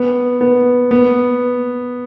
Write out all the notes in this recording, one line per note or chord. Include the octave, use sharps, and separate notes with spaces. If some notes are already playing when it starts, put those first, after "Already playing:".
Already playing: B3
B3
B3